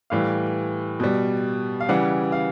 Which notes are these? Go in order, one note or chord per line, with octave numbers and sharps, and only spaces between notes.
A2 E3 G3 F5
B2 G3
F5
C#3 E3 G3 F#5
F5